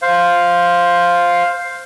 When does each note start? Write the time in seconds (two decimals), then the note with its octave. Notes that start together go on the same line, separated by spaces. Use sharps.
0.02 C5 F5